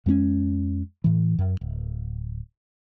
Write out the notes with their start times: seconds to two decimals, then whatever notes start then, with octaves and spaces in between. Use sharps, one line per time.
0.06 F2 G#3 C4 C#4
1.04 A2 E3
1.39 F#2
1.61 D1